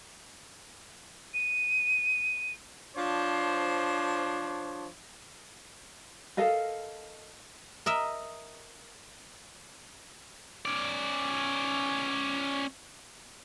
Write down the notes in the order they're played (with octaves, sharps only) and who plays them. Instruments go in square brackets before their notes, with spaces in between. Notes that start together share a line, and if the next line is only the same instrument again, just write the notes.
[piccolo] D#7
[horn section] F3 D4 C5 C#5
[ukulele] A4 A#4 D#5 F5
[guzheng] A#4 D#5 E5
[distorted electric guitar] C#4 D5